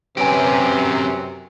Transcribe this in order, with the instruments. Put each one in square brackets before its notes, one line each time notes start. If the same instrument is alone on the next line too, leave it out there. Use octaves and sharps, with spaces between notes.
[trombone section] F#2 C3 [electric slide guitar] C4 C#4 G4 [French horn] B4 [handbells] G#5 D7